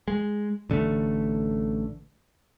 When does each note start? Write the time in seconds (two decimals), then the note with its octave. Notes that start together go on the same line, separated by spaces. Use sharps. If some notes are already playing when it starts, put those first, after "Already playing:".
0.08 G#3
0.70 A1 D3 G3 A3